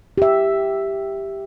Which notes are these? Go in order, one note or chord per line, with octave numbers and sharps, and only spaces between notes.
G4 E5